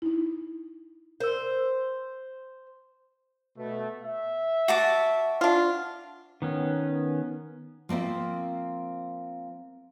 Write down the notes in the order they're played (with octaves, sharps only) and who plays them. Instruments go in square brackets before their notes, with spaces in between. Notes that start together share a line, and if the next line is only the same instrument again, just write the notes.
[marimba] D#4 E4
[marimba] A#4 E6 [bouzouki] C5
[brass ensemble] B2 A3
E5
[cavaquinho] F#4 A5 D6
[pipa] D4 F4
[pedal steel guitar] D#3 B3 C#4
[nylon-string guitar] F3 A#3 C4 E5